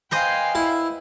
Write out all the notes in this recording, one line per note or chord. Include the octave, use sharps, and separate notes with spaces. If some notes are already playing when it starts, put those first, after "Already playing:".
B4 C5 D#5 F5 G5 G#5
E4